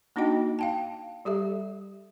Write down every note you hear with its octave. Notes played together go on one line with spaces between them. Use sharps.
A#3 D4 D#4 F#4 D#5 G5
F5 G5 A5
G3 G4 A4 E5